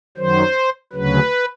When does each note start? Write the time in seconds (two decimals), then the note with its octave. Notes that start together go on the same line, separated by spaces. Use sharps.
0.17 F#2 D#3 F#3 C5
0.93 D2 C#3 F#3 B4